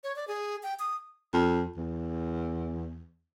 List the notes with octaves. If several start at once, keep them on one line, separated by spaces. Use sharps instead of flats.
C#5
D5
G#4
G5
D#6
F2
E2